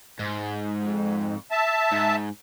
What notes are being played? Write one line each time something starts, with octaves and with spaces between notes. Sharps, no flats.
G#2
F2
E5 A5
G#2